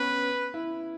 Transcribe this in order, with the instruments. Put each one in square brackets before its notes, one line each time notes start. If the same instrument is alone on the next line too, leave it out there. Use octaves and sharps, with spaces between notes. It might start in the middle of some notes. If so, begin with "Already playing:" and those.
Already playing: [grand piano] B3 C#4 [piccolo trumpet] B4
[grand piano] E4